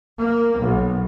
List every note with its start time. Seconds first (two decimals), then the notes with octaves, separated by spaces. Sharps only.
0.19 A#3
0.61 B1